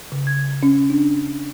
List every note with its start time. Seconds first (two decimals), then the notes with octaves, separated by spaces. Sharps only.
0.12 C#3
0.27 G#6
0.63 C#4
0.90 D4